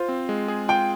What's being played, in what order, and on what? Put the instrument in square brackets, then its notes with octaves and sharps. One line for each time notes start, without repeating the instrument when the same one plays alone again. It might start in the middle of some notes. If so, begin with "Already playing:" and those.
Already playing: [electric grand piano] F4 [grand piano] C5
[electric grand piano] C4
G#3
G#4
[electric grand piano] F4 [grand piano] G5